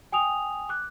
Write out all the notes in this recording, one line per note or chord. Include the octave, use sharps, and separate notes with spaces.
G5 G#5 D#6 F7
D6 F#6